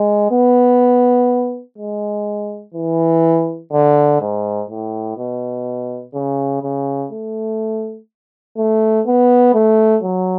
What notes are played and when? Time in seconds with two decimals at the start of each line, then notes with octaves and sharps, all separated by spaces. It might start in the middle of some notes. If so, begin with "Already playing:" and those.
Already playing: G#3
0.32 B3
1.78 G#3
2.75 E3
3.73 D3
4.21 G#2
4.70 A2
5.17 B2
6.15 C#3
6.63 C#3
7.12 A3
8.57 A3
9.07 B3
9.54 A3
10.03 F#3